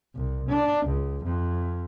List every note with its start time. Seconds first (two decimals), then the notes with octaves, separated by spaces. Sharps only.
0.15 C2
0.49 D4
0.86 C#2
1.24 F2